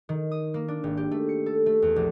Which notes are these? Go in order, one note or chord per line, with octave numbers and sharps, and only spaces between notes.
D#3
D#6
A#3
D4
G#1
G4
A3
C#7
A4
A3
E2
A#1